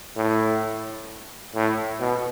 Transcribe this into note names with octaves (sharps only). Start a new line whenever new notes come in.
A2
A2
B2